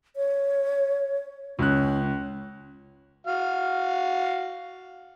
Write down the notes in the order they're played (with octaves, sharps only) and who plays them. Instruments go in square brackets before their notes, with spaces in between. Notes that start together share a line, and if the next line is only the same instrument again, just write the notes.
[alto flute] C#5
[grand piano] C#2 F#6 [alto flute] C#4
[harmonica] F#4 F5